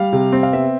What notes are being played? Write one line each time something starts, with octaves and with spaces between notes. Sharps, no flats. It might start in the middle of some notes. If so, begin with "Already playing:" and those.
Already playing: G3 F5
C3
C4
F5
B3 E5